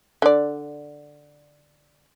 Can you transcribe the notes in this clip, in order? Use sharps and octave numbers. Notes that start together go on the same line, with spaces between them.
D3 D5